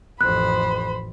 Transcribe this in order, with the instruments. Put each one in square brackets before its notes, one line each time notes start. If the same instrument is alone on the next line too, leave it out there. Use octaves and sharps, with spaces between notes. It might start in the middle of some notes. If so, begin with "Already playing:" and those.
[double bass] A1 F2 [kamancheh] C5 B5 [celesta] F#6